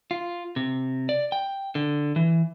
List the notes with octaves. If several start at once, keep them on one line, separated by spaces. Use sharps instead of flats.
F4
C3
D5
G5
D3
E3